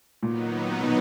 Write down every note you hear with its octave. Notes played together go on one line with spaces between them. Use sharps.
A#2 D#3 F#3 B3 D#4
B2